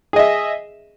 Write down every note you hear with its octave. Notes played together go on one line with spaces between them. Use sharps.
G#4 D#5 E5